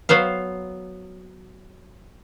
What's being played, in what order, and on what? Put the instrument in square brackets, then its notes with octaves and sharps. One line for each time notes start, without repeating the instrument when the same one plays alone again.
[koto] F#3 B3 C5 F5